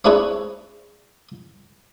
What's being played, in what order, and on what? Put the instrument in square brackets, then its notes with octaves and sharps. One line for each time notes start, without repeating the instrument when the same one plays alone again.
[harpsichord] C4 D4 E4 G#4 B4 C#5